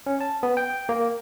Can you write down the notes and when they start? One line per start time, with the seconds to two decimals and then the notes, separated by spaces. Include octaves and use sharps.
0.06 C#4
0.21 A5
0.43 B3
0.57 G5
0.89 A#3